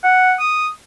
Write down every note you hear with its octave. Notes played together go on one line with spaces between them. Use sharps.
F#5
D#6